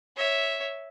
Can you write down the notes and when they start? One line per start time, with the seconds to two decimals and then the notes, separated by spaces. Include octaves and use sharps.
0.17 C#5 E5